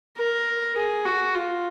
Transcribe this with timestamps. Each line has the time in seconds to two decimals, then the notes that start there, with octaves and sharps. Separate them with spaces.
0.17 A#4
0.76 G#4
1.05 F#4
1.34 F4